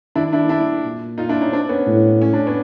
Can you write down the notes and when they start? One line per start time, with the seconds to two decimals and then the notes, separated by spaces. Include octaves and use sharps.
0.15 D#3 D4 E4
0.33 D4 E4
0.49 D4 E4
0.85 A#2
1.18 D#4 F4
1.29 D4 E4
1.41 C#4 D#4
1.52 C4 D4
1.69 B3 C#4
1.87 A2
2.22 C#4
2.33 D4
2.47 B3 C#4